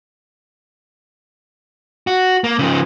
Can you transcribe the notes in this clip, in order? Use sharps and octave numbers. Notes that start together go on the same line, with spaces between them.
F#4
A#3
C#3 F3